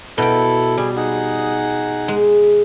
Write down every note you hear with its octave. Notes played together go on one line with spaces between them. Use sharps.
B2 E4 A4 G5
G3 G#4
D#4 G#4 F#5
G#3